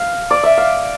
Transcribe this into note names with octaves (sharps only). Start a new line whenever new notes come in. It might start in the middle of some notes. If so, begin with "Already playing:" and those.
Already playing: F5
D5
E5
F5